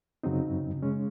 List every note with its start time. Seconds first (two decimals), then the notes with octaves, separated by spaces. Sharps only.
0.23 F#2 C#3 F#3 C4 D#4
0.83 C#3 G#3 C#4